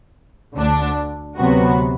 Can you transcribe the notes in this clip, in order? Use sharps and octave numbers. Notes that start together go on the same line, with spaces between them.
D2 D3 A3 D4
D2 C3 F#3 B3 F#4